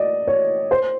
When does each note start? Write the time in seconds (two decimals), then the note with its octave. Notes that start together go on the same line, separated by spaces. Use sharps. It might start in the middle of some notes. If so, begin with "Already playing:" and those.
Already playing: D5 D#5
0.27 C#5
0.71 C5